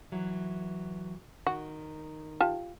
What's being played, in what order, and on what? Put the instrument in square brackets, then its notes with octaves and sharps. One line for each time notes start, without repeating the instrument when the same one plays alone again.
[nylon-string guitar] E3 F#3
[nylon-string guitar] D#3 [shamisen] F#4
[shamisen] F4 G4 A5